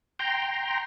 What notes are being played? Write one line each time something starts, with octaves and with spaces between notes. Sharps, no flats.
G5 A#5 C6